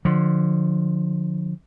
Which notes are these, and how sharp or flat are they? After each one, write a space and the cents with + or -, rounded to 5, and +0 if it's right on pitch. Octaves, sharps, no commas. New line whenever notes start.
D3 +30 F3 +30